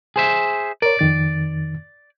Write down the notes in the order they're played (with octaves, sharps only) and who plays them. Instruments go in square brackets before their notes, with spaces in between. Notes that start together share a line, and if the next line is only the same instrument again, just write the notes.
[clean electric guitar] G#4 C5 E5
[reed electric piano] A#4 C#5 [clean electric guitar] D5
[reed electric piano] F2 D#3 A6